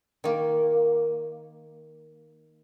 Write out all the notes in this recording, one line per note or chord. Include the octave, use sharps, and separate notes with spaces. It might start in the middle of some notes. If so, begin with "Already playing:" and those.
D#3 A#3